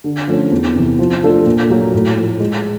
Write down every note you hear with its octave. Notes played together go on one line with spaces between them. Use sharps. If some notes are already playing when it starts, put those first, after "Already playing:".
D3
F3 A3 C#4
E2
C3 E3
F3
A3 D4 F4 A4
A#2
F#3 A#3
A2
F3 A3
G#3